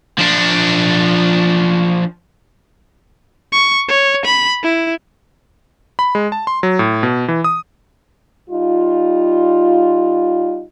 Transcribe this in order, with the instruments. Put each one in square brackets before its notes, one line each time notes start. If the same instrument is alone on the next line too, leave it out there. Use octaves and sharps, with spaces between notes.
[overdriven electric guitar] F3 D4
[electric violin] C#6
C#5
B5
E4
[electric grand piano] B5
G#3
A5
C6
F#3
A2
B2
E3
D#6
[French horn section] G3 D#4 F4